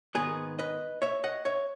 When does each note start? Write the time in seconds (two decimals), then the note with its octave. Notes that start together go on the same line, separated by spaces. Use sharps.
0.15 G#2 D#3 G#3 B3 G#4 B4
0.59 B4 D#5
1.02 C#5 E5
1.24 D#5 F#5
1.45 C#5 E5